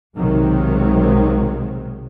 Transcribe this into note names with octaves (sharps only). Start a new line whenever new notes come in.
B1 C3 D#3 F#3 G#3